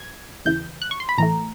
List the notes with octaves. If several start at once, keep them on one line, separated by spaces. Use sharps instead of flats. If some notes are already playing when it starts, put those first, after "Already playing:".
Already playing: G#6
E2 C#3 E3 G6
F#6
C#6
C6
B5
A2 E3 A3 A#5